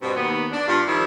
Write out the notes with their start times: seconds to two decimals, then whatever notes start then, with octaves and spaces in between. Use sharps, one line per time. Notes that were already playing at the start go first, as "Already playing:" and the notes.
0.02 G2 B2 C4
0.17 D#2 B3
0.52 D4
0.67 G2 F4
0.87 D#3 F3 G3 C4 E4 G4